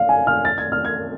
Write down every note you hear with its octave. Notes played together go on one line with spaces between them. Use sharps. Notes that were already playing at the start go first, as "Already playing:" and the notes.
Already playing: F5
G#5
F6
A6
G#6
F6
G#6